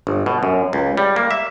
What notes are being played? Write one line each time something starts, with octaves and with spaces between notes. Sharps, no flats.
G1
B2
F#2
C#2
G3
A#3
E5